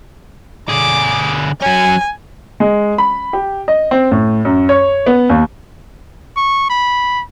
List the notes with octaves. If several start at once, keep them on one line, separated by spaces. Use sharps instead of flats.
D3 G#4 D6
F#3 C#4 G#5
G#3
B5
G4
D#5
C4
A2
F#2
C#5
B3
D#2
C#6
B5